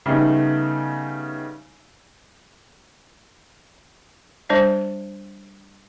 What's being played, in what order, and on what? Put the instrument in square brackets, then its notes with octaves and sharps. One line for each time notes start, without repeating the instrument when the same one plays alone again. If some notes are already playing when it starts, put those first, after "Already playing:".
[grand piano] C#3 G3 A3 B3 D#4
[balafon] G3 D4 C5 D5 E5